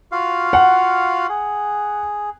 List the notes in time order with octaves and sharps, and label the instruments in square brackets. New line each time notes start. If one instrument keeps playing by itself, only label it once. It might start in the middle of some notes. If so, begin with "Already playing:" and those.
[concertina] F4 F#4 F5
[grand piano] F#5
[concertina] G#4